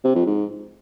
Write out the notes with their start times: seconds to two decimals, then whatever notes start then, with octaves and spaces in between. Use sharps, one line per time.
0.04 C3
0.15 F2
0.26 G#2